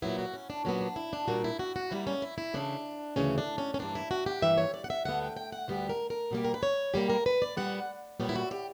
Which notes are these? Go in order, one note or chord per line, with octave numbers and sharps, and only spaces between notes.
A#2 F#3 B3 E4
F#4
C#4
D4
A#2 F#3 B3 C#4
D4
E4
D4
A#2 G3 A#3 F#4
E4
F#4
F#4
A#2 G3 A#3 E4
C#4
E4
E4
D2 C#3 E3 D4
D2 C#3 E3 C#4
D4
C#4
C#4
G2 E3 A#3 D4
E4
F#4
G4
G2 E3 A#3 E5
C#5
D5
F#5
E5
D2 D3 G3 B3 F#5
G5
G5
F#5
D2 D3 G3 B3 G4
A#4
A#4
B2 G3 A#3 G4
A#4
B4
C#5
B2 G3 A#3 G4
A#4
B4
D5
A#2 G3 B3 F#5
A#2 G3 B3 C#5
E4
F#4
G4